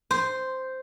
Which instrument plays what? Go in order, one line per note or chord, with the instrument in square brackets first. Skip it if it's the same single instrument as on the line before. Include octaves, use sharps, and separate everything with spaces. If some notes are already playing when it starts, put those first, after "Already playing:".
[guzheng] C5